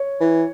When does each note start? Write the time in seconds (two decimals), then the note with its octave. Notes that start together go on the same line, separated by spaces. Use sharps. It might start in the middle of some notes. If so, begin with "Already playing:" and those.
Already playing: C#5
0.20 E3